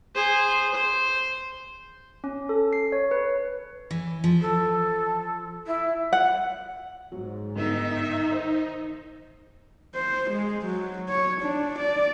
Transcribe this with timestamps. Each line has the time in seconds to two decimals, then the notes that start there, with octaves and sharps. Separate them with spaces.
0.15 G#4 C5
0.74 C5
2.24 C#4
2.49 A4
2.73 C7
2.92 C#5
3.11 B4
3.91 E3
4.24 F3
4.41 A4
5.66 E4
6.13 F#5
7.12 G#2 F#3
7.56 G1 D#3 D#4 E5
8.32 D#3 C5
9.95 C5
10.31 G#3
10.66 F#3
11.09 C#5
11.41 D4
11.79 D5